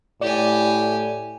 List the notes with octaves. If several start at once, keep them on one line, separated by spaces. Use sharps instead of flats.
A2 G4 D5 G#5